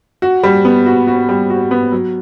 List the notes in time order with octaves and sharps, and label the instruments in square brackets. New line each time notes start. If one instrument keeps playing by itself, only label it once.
[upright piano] F#4
G3
B3
F#4
F#4
G3
F#4
B3
F#3